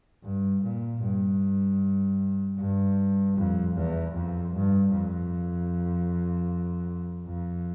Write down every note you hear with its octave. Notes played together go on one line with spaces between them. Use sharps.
G2
A#2
G2
G2
F2
E2
F2
G2
F2
F2